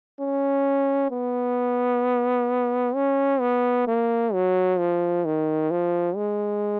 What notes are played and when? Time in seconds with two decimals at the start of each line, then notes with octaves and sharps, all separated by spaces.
0.20 C#4
1.11 B3
2.95 C#4
3.40 B3
3.87 A#3
4.33 F#3
4.78 F3
5.25 D#3
5.71 F3
6.16 G#3